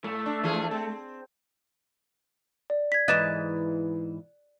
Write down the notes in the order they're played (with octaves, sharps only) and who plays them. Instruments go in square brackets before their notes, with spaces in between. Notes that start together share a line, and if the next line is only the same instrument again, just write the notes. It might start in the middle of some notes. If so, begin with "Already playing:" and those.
[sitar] A2 [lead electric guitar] A3
[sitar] D4
E3 F3 G#4
C4
[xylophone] D5
G#6 B6
[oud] G#2 E3 D#5 [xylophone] F#6 A6 E7